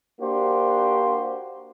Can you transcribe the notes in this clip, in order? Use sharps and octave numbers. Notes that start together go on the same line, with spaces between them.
A#3 D4 F#4 G4 C5